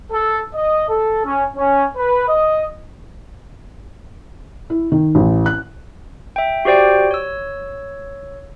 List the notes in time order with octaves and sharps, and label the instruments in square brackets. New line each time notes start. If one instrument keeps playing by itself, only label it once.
[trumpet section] A4
D#5
A4
C#4
C#4
B4
D#5
[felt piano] E4
D#3
A1
F#6
[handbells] E5 G5
F#4 G4 C5 D5 G5
C#5 E6